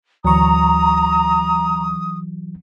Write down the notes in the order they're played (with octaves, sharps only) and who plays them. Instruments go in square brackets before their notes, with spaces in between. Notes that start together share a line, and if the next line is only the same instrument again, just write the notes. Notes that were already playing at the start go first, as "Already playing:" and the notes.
[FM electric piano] D2 C#6 [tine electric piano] E3 F#3 [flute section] A#5 [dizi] D#6